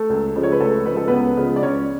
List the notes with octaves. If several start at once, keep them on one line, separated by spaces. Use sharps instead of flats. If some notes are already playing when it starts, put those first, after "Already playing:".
Already playing: A3 A4
C#2
C#3 F3 G#3
C#5
B4
C#2 A3 A4
C#3 F3 G#3 B4
A4
C#2 B3 B4
C#3 F3 G#3
D5
C#2 C#4 C#5